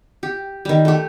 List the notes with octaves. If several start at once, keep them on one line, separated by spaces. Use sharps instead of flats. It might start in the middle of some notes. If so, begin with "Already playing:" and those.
G4
D#3 G3
A3 G4